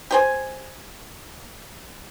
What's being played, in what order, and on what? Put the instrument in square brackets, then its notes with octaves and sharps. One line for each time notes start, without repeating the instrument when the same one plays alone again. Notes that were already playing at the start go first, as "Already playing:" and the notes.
[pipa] G4 C5 G#5